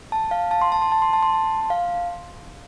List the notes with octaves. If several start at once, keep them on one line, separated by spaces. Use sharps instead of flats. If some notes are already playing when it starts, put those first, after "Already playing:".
A5
F5
A5
C6
A5
C6
A5
C6
A5
C6
A5
F5